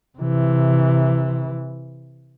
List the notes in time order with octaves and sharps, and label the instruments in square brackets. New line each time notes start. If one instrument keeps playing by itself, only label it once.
[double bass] C3 E3